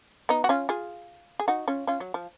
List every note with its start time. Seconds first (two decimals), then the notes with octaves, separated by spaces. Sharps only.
0.29 B3 D#4
0.44 F#4
0.49 C#4 F4
0.69 F4 G#4
1.40 G#4
1.48 D#4 F#4
1.68 C#4 F4
1.87 C#4 F4
2.00 F#3
2.14 F3